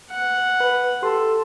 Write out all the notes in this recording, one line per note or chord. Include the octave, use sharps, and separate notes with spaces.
F#5
B4
G4 A4 C6